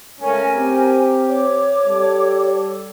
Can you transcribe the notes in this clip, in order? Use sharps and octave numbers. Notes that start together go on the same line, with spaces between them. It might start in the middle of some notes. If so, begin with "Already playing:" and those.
C#2 A3 C#4 A#4 G#5
C4 G4
C#5 D6
G3 A4